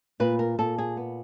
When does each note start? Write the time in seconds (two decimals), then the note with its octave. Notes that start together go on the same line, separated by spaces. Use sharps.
0.20 A#2 B4
0.39 A#4
0.59 A#2 A4
0.78 G#4
0.97 B3